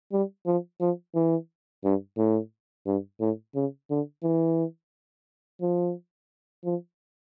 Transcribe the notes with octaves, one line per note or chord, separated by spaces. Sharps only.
G3
F3
F3
E3
G2
A2
G2
A2
C#3
D3
E3
F3
F3